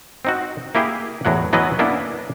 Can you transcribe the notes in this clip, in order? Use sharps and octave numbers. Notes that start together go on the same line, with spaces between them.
C4 D#4 F#4
A#3 E4 G4 G#4
E2 A2 F#3 F#5
E3 F#3 B3 E4 B4 D#5
A#3 B3 C#4 D4 E4